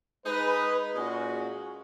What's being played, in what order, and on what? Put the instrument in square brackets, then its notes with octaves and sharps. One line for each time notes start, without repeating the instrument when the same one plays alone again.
[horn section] G#3 D#4 G#4 B4
A#2 G#3 C#4 F#4